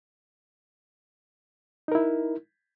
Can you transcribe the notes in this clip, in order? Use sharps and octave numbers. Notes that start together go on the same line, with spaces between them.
D#4 E4 A#4